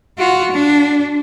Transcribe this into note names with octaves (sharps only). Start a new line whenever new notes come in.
F4 F#4
D4